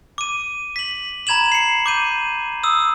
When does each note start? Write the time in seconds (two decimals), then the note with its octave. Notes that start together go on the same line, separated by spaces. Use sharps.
0.18 D6 D#7
0.76 B6 F#7
1.27 A#5 B5 G#6 E7 F#7
1.52 C7 C#7
1.86 D6 G6 D#7
2.63 D#6 E6